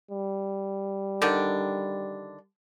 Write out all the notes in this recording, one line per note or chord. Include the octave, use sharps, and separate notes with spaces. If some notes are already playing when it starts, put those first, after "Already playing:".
G3
D3 D#3 D4